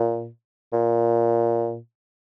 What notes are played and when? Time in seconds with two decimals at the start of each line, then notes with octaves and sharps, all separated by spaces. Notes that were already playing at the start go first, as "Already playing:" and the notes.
Already playing: A#2
0.73 A#2